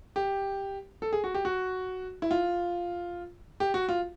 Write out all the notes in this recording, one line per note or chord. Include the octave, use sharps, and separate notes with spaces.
G4
A4
G#4
F#4
G4
F#4
E4
F4
G4
F#4
F4